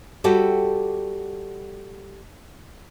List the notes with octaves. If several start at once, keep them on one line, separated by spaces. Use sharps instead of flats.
G3 F#4 G4 A4